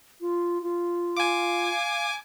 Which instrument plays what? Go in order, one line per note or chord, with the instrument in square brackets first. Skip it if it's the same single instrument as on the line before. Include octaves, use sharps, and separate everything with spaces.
[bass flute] F4
F4
[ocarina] F5 [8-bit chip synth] G#5 D6